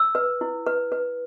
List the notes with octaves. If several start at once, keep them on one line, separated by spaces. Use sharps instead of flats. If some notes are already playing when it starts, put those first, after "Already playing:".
Already playing: E6
B4
E4
B4
B4